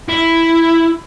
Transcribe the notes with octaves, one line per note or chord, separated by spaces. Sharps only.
E4